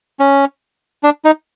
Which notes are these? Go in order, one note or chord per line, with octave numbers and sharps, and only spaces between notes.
C#4
D4
D#4